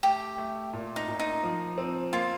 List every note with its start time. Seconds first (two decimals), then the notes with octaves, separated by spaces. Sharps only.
0.03 A3 G4
0.38 A3
0.73 A#2
0.96 D#4
1.08 A#2
1.20 D#4
1.43 F3
1.78 C4
2.13 A#3 F4